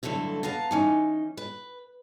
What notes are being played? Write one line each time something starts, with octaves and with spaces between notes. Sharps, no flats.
G2 D3 F#3 A3 E4
B3 F5 A5 A#5
E3 C#4 D#4
B4